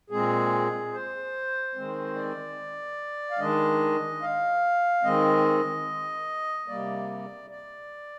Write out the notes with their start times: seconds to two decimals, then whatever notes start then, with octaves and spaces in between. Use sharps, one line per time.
0.10 A#2 G#3 C4 G#4
0.93 C5
1.75 D#3 G#3 C4
2.15 D5
3.31 F5
3.39 D#3 G#3 D4 D#5
4.22 F5
5.04 D#3 G#3 C4 D#5
6.68 C3 G3 A#3 D5
7.50 D5